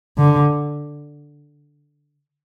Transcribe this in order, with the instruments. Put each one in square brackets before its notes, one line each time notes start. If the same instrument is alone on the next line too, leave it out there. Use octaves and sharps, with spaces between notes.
[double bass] D3